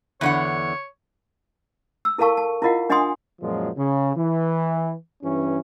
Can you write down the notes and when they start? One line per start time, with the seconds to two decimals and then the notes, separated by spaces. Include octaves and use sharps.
0.21 E2 D3 C#5 F#5
2.05 E6
2.18 E4 A4 A#4 F5 A5 C#6
2.37 A5
2.62 E4 F4 A#4 D#5 F5 F#5
2.90 D4 D#5 F#5 G#5 C6 D#6
3.41 F#2 A#2 F3 F#3 G#3
3.77 C#3
4.16 E3
5.22 G2 E3 C#4